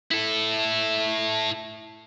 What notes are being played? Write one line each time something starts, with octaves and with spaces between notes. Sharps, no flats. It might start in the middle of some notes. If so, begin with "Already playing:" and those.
E4 A4